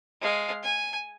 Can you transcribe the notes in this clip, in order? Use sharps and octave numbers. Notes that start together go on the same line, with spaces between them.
G#3 F5
G#5